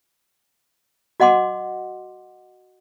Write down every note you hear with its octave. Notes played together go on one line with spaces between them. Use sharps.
F#4 D#5 F#5 C6 D6